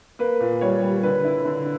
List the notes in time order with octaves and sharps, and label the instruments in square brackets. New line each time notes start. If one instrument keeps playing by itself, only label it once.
[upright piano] A#3 B4
A#2
G3 C#5
G3
D3 B4
E4
D3